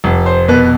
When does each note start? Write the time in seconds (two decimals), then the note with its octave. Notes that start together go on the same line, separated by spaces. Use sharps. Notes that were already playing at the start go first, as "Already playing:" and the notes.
0.04 F1
0.26 C5
0.48 B2 B4